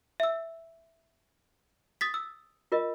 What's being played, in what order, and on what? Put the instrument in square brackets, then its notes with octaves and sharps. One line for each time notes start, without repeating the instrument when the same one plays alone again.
[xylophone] E5 E6
D#6 A6 B6
E6
[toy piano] F4 A#4 D#5